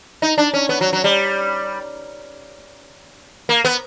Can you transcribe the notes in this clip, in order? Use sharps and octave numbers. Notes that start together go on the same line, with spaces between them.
D#4
D4
C#4
B3
F#3
F#3
G3
A#3
B3